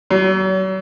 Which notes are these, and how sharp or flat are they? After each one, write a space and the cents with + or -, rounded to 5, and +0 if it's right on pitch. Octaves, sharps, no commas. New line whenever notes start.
F#3 +40